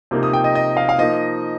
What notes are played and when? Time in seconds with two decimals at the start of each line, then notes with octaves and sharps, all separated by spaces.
0.11 C3 F3 A#3 D#4
0.23 D#6
0.33 G5
0.44 D#5
0.55 D#5
0.77 F5
0.89 F5
0.98 F3 A#3 D#4 D#5